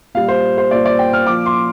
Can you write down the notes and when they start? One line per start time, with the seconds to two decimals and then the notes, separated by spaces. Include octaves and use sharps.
0.15 A#2 G3 F5
0.28 C5
0.58 C5
0.71 A#2 G3 D5
0.86 D5
0.99 G5
1.13 F6
1.27 A#2 F3 D6
1.46 C6